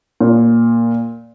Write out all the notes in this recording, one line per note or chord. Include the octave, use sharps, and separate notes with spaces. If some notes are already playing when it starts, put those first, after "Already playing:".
A#2